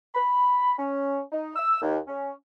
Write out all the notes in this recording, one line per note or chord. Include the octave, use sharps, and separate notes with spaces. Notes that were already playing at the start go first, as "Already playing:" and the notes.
B5
C#4
D#4
E6
D#2
C#4